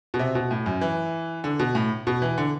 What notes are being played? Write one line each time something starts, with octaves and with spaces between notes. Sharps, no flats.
B2
C3
B2
A2
F#2
E3
D3
B2
A2
B2
E3
D3